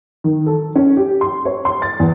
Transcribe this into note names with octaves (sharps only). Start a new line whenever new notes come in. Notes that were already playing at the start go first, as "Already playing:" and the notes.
D#3
A4
C#4
G4
C6
C#5
C6
A6
E2